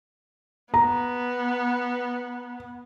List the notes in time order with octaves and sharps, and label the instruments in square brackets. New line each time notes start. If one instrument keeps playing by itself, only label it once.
[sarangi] B3 [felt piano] A#5